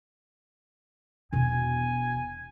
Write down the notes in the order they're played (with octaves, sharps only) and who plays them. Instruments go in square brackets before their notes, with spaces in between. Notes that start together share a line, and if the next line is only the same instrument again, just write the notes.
[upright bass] E1 B2 [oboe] G#5